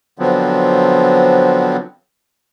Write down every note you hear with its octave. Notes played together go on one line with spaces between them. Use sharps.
D3 F3 F#3 B3 C4